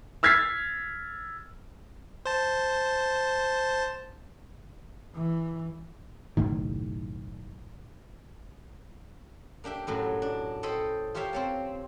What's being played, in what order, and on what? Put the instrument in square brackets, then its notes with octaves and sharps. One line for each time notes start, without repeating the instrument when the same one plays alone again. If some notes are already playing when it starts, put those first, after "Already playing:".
[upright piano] E6 F6 G#6 A6 B6 C7
[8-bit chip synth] C5 A5
[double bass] E3
[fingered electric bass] F#1 B1 A2 D#3
[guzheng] A#3 D4 G4 E5
F#2 A2 F#3
D4
A4 C5 C#5 D#5 G5 B5
F4 G4 A#4 C#5 E5 F5
C4 C#5 A5